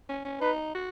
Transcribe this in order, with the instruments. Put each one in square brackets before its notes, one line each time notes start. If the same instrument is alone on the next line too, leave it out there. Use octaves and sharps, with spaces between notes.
[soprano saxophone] C#4
C#4
[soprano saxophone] D#4 [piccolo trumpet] B4
[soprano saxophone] F#4